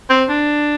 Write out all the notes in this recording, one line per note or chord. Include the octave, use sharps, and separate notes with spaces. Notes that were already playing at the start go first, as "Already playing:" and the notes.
C4
D4